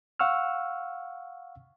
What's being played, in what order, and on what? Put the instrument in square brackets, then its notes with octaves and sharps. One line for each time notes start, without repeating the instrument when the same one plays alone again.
[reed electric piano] F5 F#5 C#6 E6 F6